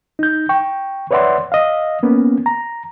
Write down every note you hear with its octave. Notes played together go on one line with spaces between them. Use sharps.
D#4 G6
G5 C#6
B4 C#5 D5 E5 F#5 C6
D#5 F5
A#3 B3 C#4
A#5